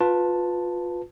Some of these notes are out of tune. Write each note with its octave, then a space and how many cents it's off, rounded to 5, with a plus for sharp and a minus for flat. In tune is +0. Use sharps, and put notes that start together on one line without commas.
F4 +25 B4 +0 A5 +0